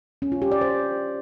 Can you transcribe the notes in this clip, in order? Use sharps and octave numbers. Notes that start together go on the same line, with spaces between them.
C#4
F4
G4
D5
C5